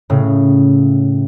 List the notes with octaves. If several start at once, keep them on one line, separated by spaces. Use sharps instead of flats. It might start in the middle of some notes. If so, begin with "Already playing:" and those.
A2 C#3